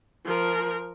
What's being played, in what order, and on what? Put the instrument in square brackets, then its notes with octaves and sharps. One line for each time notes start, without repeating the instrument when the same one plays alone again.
[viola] F3 A#4